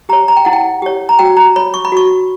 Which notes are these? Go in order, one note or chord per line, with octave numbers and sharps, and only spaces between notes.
G4 C#5 A#5
A#5
G5
E4 F#5
G5
G4 C#5
A#5
F#4 G5
A#5
C#5 B5
C#6
B5
F#4 C#6